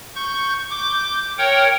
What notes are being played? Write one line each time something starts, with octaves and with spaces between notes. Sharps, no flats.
C#6 G6
D6 G6
A#4 C#5 F#5 G5